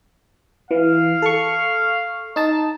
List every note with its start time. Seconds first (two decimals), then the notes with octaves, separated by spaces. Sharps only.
0.71 E3 F5
1.22 A4 C#6
2.36 D#4 A5